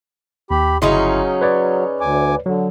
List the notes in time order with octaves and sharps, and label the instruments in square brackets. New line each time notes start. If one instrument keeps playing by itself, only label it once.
[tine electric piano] D#2 [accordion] G4 B5
[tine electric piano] G1 E4 C6 [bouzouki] C#3 C#4 D#4 [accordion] F#3
[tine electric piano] B4 C#5 D5
[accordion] D2 G#5 D6
[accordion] D3 [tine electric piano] F#3